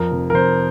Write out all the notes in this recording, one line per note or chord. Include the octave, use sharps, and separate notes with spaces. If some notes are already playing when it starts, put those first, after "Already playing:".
Already playing: F2 A#4
F1
A#4
F1 C5